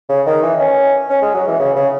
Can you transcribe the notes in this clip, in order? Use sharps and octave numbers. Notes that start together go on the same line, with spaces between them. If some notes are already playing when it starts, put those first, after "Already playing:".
C#3
D#3
E3
C#4
C#4
G#3
F#3
E3
C#3
C#3